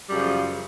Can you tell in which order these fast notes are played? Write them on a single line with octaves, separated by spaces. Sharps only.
G3 F#2 C#3 F3